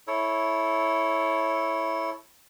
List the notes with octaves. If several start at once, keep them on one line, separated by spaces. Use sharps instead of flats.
E4 A4 C#5